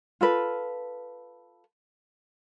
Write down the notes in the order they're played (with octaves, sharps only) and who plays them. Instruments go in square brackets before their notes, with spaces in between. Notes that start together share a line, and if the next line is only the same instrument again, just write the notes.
[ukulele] F4 A4 B4